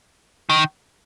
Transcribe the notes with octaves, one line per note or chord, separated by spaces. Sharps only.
D#3